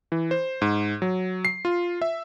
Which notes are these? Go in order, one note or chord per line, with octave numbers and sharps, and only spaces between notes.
E3
C5
G#2
F#3
C7
F4
E5